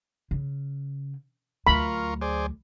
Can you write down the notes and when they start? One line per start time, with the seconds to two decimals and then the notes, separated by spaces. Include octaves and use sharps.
0.31 C#3
1.67 D2 F#3 F4 A#4 B5 C#6
2.21 G#4 C5 D5